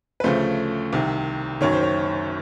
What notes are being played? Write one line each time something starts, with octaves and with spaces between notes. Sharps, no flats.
B4
D2 C#3 F3 A3 C5
C2 C3 D#3
F#1 F#2 D#3 C#5
C5
C#5